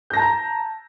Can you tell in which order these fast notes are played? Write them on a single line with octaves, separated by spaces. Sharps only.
G6 A#6 A5 A#5